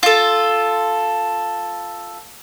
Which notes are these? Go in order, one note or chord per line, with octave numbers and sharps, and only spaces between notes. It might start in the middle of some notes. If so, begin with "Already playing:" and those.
F4 A4